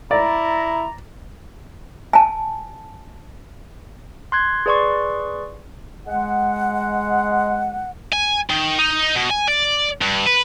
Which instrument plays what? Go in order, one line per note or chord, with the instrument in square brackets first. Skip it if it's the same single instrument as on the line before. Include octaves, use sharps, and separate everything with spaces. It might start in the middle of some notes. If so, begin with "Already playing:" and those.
[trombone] E4 [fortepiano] D5 [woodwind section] A#5
[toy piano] G#5 A5
[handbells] C6 F#6 G#6
G#4 B4 D5 C6 C#6
[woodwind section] G#3 F#5
[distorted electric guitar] G#5
D#3
D#4
B2
G#5
D5
G2
B4